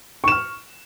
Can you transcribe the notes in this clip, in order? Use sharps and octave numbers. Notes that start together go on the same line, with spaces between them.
C#6 F6 E7